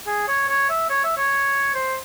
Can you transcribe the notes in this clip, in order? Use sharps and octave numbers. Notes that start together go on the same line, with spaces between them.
G#4
C#5
C#5
E5
C#5
E5
C#5
C5